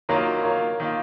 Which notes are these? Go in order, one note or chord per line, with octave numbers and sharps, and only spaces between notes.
D#3 F#3 A#3 F4 A#4 C#5
A#4 C#5
D#3 A#3 F4